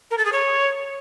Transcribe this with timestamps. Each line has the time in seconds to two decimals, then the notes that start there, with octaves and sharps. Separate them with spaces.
0.11 A#4
0.18 A4
0.25 G#4
0.32 C#5